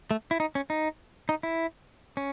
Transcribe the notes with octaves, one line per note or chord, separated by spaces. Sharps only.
A3
E4
D#4
C#4
D#4
D#4
E4
C#4